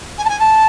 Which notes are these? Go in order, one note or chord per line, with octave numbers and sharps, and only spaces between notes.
G#5
A5
G#5
A5